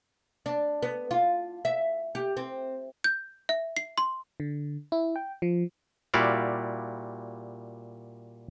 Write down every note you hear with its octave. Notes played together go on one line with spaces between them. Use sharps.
D4
B3
F4
E5
G4
C4
G6
E5
C7
C6
D3
E4
G5
F3
A#2 G3 E4 F#4 D5 F5